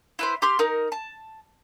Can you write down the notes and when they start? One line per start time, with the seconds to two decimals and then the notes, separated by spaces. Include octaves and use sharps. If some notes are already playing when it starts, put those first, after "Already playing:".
0.19 E4 B4 C5
0.42 G4 C6 F6
0.59 D#4 A#4
0.92 A5